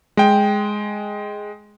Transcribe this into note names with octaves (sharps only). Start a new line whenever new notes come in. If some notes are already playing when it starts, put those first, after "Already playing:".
G#3 G5